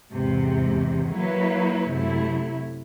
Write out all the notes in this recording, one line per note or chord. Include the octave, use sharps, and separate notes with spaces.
E2 G#2 C3
F#3 A#3 E4 B4 C#5
F#2 C3 F#3 A3 E4